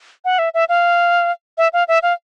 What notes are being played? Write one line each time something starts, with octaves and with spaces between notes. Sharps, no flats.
F#5
E5
E5
F5
E5
F5
E5
F5